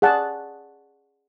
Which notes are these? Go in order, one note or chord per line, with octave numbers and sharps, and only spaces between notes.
G#4 D5 F#5 A5